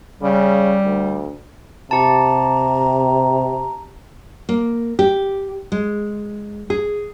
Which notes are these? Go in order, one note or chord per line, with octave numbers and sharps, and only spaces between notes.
C#3 G3
D2
C3 G4 A5 A#5
A#3
G4
G#3
G#4